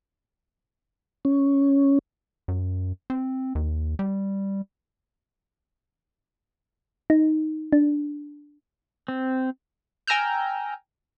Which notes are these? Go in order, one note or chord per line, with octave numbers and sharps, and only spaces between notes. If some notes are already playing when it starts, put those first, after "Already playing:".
C#4
F#2
C4
D#2
G3
D#4
D4
C4
G5 G#5 A#5 E6 F6 G6